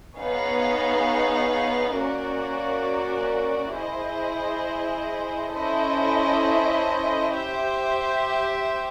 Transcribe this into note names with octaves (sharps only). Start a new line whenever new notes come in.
B3 D#4 G#4 C#5 F5
A#3 C#4 F#4 A#4 D5
E4 G#4 C5 D#5
C#4 E4 A4 C5 D#5
G4 C5 E5